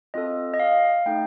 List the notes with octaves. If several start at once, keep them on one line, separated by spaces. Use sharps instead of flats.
C4 F4 A4 D#5
D#5
F5
A3 D#4 A4 G5